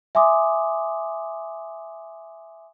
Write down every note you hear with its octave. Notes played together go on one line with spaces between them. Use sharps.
E5 G#5 C6 D6 D#6